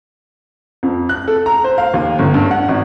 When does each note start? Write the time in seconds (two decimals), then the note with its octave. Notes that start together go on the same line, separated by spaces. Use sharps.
0.83 F2
1.09 F#6
1.28 A4
1.46 A#5
1.64 C5
1.78 F5
1.94 D#2
2.19 G1
2.34 G2
2.51 F#5
2.69 G#1